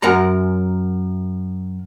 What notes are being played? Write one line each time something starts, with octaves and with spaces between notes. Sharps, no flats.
F#2 A#4 F#5 A#5